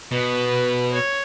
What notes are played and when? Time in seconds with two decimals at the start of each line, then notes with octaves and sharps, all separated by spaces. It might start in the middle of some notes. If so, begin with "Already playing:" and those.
0.11 B2 B4
0.93 C#5